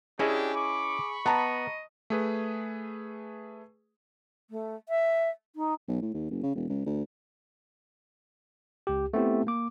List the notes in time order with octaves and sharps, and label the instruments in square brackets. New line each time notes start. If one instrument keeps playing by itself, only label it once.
[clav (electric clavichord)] C#4 E4 D#5 [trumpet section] D4 G4 [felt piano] G#4
[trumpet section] B5 C#6 [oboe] D6
[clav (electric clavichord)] B3 [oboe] D#5 [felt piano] A5 A#5
[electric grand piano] A3 G#4 B4
[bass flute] A3
E5
D#4
[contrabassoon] B1
A2
D#2
F#1
C#3
E1
C#2
D2
[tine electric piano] C#2 G4
A3 B3 C4 E4 G4
A#3 D6